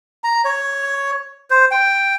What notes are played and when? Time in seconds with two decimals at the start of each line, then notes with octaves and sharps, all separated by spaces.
0.24 A#5
0.45 C#5
1.51 C5
1.71 G5